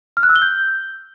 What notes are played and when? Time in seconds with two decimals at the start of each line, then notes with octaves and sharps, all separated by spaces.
0.17 F6
0.23 F#6
0.29 E6
0.36 G7
0.42 G6